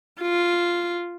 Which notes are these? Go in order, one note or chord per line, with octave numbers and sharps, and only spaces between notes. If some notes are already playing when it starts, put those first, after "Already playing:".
F4